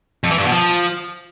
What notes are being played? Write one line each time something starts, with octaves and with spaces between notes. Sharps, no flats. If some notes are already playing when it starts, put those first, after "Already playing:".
F2
E3
G2
B2
F3